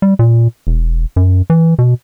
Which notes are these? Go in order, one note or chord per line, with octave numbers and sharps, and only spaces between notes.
G3
A#2
E1
F#2
E3
B2